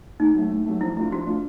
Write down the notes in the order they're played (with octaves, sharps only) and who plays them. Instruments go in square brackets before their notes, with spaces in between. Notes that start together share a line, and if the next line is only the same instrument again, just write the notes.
[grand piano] A2 [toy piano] D#4
[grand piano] F#3 A3
A2
F#3 A3
[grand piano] F3 [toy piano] E4
[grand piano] A3 D4 F4 [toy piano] E4
[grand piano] F3 [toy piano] F#4
[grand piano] A3 D4 F4